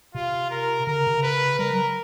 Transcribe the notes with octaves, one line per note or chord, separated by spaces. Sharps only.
C3 F4
A#4
D3 A#4
C#3
C3
C#3
B4
G3 A#4
F#3